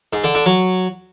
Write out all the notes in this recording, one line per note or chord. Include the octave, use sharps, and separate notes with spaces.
G#2
D3
D3
F#3